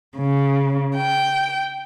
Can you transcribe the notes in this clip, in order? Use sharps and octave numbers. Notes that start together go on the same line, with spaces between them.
C#3
G5